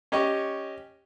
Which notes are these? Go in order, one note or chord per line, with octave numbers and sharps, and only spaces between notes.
C#4 G4 D#5 C#6